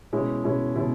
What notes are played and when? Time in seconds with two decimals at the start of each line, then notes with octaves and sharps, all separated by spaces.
0.13 B2 G#3 C#4 E4
0.44 B2 G#3 C#4 E4
0.76 B2 G#3 C#4 E4